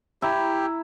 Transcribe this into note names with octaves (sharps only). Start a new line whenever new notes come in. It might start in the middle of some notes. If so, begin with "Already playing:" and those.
E4 G4 A#5